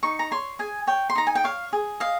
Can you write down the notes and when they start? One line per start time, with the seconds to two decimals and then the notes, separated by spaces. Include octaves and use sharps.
0.03 D#4 C#6
0.19 A#5
0.31 C#5 C6
0.59 G#4 G#5
0.87 C#5 G5
1.10 C6
1.15 D#4 A#5
1.27 G#5
1.35 G5
1.44 C#5 F5
1.73 G#4
2.00 D#5 F5